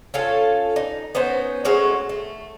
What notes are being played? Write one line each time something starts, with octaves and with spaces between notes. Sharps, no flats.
C#4 F4 A4
D#4
B3 C#4 D#4 C5
G#3 A3 C#4 F#4
A3